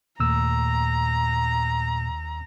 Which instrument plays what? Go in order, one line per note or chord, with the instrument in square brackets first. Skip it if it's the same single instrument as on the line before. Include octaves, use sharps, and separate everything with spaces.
[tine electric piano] D#2 E6 [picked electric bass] A#2 A3 [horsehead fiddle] A#5